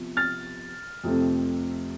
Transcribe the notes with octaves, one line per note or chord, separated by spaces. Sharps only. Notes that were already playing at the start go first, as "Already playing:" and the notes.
Already playing: C3 F3 B3
F6 A6
F2 C3 F3 A3 C4